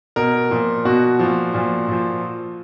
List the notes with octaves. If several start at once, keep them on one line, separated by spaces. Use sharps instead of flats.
B2 A#4
A#2 F3
B2 F#4
A#2 F3
A#2 F3
A#2 F3